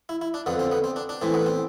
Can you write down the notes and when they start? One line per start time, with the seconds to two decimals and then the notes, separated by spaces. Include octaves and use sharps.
0.09 E4
0.22 E4
0.34 D4
0.46 F2 D3 B3
0.59 C4
0.72 B3
0.84 C4
0.96 D4
1.09 D4
1.21 A2 E3 C4
1.34 B3
1.46 C4